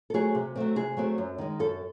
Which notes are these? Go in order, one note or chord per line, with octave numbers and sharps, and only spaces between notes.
A4
F#3 A3 C4 G#4
C3
F#3 A3 C4
C3 G#4
F#3 A3 C4
F#2
D#3 G#3
F#2 A4